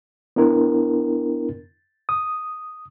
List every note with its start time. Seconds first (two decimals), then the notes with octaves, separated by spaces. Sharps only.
0.36 B3 D4 E4 A#4
2.09 D#6